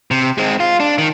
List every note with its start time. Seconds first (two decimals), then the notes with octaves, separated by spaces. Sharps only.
0.11 C3
0.38 G#3 C4
0.60 F4
0.80 D4
0.98 D#3